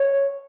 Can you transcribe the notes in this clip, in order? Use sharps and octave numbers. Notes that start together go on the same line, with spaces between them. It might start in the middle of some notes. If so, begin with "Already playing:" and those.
Already playing: C#5